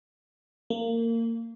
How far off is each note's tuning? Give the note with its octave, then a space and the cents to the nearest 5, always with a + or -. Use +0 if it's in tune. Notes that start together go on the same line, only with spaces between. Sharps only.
A#3 -25